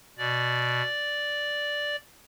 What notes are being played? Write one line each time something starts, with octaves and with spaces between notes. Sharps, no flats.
B2 D5